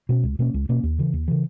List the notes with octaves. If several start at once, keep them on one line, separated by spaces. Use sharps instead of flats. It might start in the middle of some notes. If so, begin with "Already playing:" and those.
B2 A#3 C#4
C#2
B2 A#3 C#4
C#2
B2 A#3 C#4
D#2
C#3 E3
D#2
C#3 E3